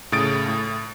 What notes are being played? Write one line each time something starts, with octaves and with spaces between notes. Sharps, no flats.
A2 C#3 D#6 A6 D7
A2